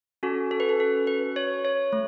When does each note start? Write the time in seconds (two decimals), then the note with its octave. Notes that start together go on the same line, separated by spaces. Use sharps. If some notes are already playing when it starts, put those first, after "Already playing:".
0.23 C#4 F#4 A4
0.51 A4
0.60 B4
0.69 A4
0.80 A4
1.07 B4
1.36 C#5
1.65 C#5
1.93 A3